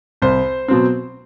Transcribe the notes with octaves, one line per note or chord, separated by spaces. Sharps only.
C2 C5
B2 F#3 C4